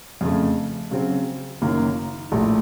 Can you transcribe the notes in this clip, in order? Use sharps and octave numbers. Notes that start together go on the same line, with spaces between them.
F2 C#3 A3
C#3 F#3 C4
F#1 F#2 D#3 A#3
A#1 A2 A3